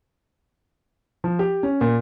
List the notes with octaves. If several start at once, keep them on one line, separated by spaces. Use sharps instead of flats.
F3
G4
C#4
A#2